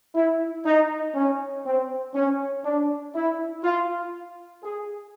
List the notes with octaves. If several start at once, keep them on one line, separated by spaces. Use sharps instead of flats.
E4
D#4
C#4
C4
C#4
D4
E4
F4
G#4